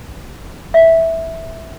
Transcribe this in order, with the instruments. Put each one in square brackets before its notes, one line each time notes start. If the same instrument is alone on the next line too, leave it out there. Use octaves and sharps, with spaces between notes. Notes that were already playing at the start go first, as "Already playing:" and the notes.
[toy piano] E5